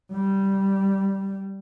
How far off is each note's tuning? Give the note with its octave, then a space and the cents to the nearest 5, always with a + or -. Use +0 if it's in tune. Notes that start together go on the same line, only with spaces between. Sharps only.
G3 -10